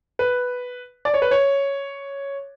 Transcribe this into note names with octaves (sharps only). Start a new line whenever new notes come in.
B4
D5
C#5
B4
C#5